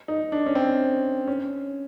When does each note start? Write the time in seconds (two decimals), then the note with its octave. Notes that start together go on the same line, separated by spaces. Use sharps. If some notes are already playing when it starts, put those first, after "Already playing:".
0.08 D#4
0.32 D4
0.46 C#4
0.55 C4
1.28 C#4